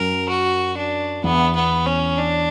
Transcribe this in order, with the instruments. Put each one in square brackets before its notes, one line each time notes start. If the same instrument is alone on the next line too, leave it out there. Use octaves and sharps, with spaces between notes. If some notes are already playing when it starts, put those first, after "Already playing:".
Already playing: [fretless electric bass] F#2 [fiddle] A#4
[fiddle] F#4
D4
[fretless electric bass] E2 [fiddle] B3
[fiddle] B3
C#4
D4